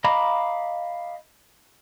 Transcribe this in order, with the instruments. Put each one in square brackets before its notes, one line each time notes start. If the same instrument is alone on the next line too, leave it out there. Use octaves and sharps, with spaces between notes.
[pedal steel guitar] D#5 F5 A#5 B5 D6